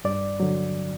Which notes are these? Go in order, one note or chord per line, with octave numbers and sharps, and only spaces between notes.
G2 D5
D3 F#3